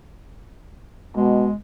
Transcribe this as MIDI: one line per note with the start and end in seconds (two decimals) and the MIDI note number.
1.17 1.49 47
1.17 1.54 56